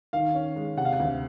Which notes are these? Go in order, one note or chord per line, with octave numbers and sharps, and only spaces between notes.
D#3 F5
C#4
G#3
C3 F#5
F5
F#5
D2